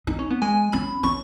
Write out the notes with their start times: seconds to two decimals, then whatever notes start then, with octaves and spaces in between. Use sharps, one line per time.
0.07 D#4
0.19 C#4
0.30 B3
0.42 G#3 G#5
0.72 C#4 B5
1.03 C#4 C#6